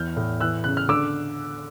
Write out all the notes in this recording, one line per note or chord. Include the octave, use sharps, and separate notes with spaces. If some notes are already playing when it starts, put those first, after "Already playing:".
Already playing: E2 E3 F6 G6
A2
E3 E6 F#6
C#3 F#6
F6
D3 D6 E6